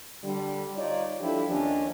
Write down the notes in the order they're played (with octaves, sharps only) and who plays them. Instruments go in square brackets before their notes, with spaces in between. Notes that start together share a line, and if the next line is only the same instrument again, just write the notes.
[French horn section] D3 G3
D#4 F4 C#5 D5
F3 G3 D4 E4 G4 A4
D#2 D#3 F3 C#4 D4